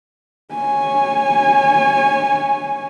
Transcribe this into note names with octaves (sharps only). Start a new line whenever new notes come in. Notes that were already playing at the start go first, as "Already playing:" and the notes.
C#5 G#5